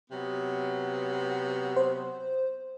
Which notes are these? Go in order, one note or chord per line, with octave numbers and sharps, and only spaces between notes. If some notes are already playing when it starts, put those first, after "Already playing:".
C3 F#3 B3
C5